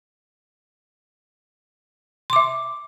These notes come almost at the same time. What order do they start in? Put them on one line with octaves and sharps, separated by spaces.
C6 D6 E5